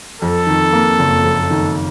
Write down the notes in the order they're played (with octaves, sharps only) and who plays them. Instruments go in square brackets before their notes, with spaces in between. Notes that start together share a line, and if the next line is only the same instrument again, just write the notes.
[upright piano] F2 [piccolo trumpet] A4
[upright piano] D#3
A#3
F#1
F2
D#3